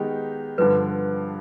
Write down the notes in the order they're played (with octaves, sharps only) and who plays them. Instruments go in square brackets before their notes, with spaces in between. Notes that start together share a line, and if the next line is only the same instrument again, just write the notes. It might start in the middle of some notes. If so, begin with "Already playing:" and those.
Already playing: [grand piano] D#3 G#3 B3 D#4 G4
[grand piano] G2 D3 F3 [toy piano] B4